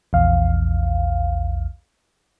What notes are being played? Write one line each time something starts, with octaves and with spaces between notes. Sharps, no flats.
A#1 E2 F5